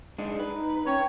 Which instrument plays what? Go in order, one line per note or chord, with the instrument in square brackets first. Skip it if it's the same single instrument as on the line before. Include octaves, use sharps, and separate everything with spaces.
[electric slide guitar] G#3 D4 D#4
[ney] D#4 [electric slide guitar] B4
[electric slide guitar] C#4 [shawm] C#5 [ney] G5